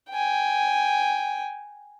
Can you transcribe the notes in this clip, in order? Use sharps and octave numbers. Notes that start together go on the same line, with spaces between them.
G5 G#5